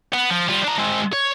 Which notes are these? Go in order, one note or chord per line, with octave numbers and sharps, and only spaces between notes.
B3
F3
G3 F4
D4 A#5
G#3 C4
C#5